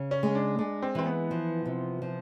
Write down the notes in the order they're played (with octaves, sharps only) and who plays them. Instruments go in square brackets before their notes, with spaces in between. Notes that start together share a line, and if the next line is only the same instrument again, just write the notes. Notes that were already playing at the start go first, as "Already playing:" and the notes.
Already playing: [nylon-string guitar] C#3
[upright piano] C#4
[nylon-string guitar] G#3
[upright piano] D4
[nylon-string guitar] G#3 [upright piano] D4
[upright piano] C4
[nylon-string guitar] E3 [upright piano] C4
[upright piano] B3
[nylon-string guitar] F3
C3
F3